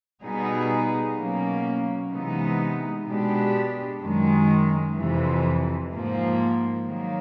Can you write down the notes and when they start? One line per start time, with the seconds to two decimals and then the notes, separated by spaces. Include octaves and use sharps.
0.22 B2 G3 B3 D#4 G#4
1.17 B2 F#3 A#3 C#4
2.12 C3 E3 G#3 B3 D#4
3.06 B2 G#3 B3 D4 G4
4.01 F#2 D#3 G#3
4.95 F2 C3 E3
5.91 G#2 F3 A#3
6.85 D#3 F#3 A#3